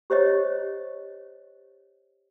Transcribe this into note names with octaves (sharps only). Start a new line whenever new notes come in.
G4 C5 C#5 D#5